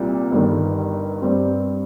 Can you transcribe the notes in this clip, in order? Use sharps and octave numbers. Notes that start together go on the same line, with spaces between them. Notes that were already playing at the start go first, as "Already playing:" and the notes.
Already playing: C2 A#2 G3
G1 G2 D#3
G2 G3 C4